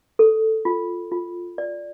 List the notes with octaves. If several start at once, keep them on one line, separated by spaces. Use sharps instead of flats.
A4
F4
F4
D5